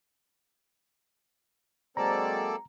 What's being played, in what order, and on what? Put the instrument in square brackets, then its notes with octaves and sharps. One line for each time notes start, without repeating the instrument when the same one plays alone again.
[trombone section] F#3 G#3 C4 [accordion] A#3 A4 D5 [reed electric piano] A#5